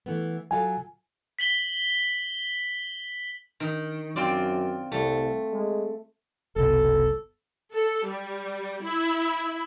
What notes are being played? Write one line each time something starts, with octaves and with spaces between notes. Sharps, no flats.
E3 A3 B3
F#3 F4 A4 G#5
B6 F#7 G7
D#3
F#2 C4 F4 D5
C2 A3
G#3
F#1 C2 B2 A4
A4
G3
E4